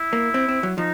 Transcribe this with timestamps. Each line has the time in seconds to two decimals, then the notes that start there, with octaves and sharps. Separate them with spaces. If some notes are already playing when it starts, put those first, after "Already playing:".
Already playing: E4
0.13 A#3
0.34 C4
0.48 C4
0.63 F#3
0.78 F3 D#4